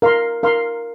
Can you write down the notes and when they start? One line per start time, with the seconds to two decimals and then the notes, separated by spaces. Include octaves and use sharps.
0.02 A#4 F5 C6
0.43 A#4 F5 C6